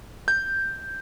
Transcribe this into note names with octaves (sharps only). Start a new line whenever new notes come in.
G6